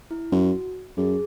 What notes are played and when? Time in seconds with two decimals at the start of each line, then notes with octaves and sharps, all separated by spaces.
0.11 E4
0.32 F#2 F#4
0.97 F#2 G#4